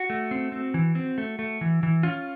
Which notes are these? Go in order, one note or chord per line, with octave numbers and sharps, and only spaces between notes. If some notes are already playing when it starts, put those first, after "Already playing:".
Already playing: F#4
A3
C4
C4
E3
C4
A3
A3
E3
E3
C#4 F4